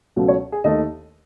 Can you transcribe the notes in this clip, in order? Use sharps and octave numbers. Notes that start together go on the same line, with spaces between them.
C#2 B2 F#3 A3
C#5
G#4
D#2 D#3 A3 D#5